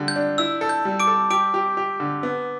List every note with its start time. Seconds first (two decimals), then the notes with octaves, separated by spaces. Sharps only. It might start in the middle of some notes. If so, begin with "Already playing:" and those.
Already playing: D3 G3 D4
0.08 G6
0.16 D4
0.38 E4 E6
0.61 A4
0.69 G6
0.85 G3
1.00 D6 D7
1.07 A4
1.30 G4 D6 D7
1.54 G4
1.77 G4
2.00 D3
2.23 B3